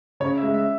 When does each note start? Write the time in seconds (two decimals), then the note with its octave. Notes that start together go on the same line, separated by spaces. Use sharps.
0.20 C#3 C#5
0.38 E5
0.43 G#3
0.54 E5